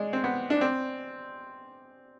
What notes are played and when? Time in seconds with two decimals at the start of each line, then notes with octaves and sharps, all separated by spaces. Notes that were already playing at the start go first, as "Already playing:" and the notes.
Already playing: G#3 D4
0.13 C4
0.24 B3
0.50 D4
0.61 C4